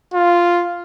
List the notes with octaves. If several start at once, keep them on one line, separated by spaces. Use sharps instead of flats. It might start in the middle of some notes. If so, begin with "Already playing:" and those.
F4